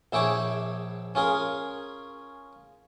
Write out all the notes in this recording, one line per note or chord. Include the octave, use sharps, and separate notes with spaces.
A#1 E4 G#4 C#5 G5 D6
C#4 F4 G#4 A#4